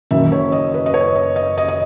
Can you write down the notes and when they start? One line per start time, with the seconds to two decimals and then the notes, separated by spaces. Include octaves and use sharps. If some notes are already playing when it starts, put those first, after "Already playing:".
0.11 F#1 F#2 D#3 E5
0.32 C#5
0.52 D#5
0.74 B4
0.86 D#5
0.94 C#5
1.15 D#5
1.36 D#5
1.58 D#5
1.68 D#5